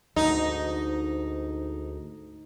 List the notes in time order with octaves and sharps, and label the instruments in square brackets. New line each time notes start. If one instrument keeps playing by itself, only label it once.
[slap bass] D2 G#2 [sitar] D#4